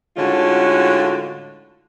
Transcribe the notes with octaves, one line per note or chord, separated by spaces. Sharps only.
A2 D3 G#3 C#4 F4 F#4